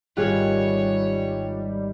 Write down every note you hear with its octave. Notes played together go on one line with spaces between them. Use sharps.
G#1 G3 F4 G4 G#4 C#5 F#6